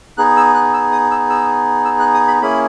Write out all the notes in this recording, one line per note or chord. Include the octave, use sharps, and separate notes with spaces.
B3 D#4 G#4 F#6
E6
F#6
E6
D#6
E6
E6
E6
F#6
D#6
B5
A#3 C#4 E4 G#4 B5